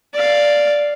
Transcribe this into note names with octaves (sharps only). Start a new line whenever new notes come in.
D5 F5